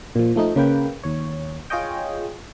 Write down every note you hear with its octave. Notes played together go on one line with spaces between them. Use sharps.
A#2 F3
F3 A3 D#4
C#3 A#3 B4 G5
D#2 C#5
F4 G#4 C#5 D#5 G5